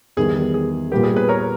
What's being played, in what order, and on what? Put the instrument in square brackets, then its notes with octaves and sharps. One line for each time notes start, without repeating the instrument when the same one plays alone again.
[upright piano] E2 D#3 G3 [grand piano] G#4
[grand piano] G#4
[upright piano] A#2 G3 B3 [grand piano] G4
[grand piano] G#4
G#4 B4
A#4 C#5